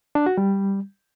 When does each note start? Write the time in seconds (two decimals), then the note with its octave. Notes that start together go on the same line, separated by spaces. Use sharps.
0.15 D4
0.26 F#4
0.37 G3